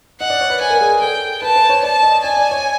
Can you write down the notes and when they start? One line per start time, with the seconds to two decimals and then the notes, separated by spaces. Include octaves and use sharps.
0.20 D#5 F#5
0.30 D5
0.41 C#5
0.50 B4
0.61 B4 G#5
0.70 A#4
0.81 G#4
1.01 A4 G5
1.42 B4 A5
1.56 C5
1.69 C#5
1.83 D5 A5
2.03 D#5
2.24 D5 G#5
2.37 D5
2.51 C#5